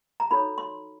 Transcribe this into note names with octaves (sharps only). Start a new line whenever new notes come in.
A#5
D#4 F#4 A4 C#5 B5
C6